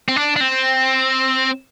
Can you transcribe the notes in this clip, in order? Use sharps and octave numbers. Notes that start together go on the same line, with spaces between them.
C4
D4
D4
C4